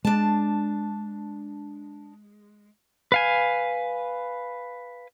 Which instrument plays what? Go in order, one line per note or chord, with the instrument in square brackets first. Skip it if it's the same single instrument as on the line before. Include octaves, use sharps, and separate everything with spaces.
[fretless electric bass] G#3 [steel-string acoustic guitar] D4 A5
[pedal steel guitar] B4 F5 G#5